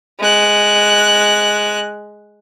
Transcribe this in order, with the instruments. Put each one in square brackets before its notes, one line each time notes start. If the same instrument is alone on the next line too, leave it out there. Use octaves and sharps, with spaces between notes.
[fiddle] G#3 F#6